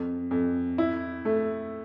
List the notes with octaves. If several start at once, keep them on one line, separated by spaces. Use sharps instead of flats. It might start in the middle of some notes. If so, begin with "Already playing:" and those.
Already playing: F2
F2
E4
A3